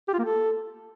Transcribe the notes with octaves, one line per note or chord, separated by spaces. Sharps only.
G4
F4
A#3
A4